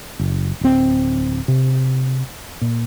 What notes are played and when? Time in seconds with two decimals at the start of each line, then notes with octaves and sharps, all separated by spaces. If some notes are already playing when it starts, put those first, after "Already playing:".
0.19 F#1
0.61 D1 C4
1.48 C3
2.61 A#2